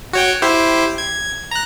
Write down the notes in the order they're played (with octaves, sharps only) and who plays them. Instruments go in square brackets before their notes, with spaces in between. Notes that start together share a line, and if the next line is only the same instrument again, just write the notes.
[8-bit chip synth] F#4 C#5 G5
E4 G4 C5
G#6
A#5 F#6